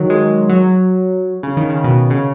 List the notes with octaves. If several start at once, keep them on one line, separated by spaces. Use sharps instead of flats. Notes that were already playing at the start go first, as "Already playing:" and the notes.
Already playing: D#3 F#3
G#3
F#3
C#3
D#3
C#3
B2
C#3